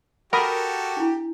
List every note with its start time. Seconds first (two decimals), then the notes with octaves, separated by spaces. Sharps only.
0.33 F#4 G4 A4 A#4 F#5 B5 D#6
0.97 D4 E4